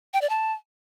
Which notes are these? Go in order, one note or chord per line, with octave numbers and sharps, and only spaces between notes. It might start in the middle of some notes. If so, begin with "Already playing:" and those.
G5
D5
A5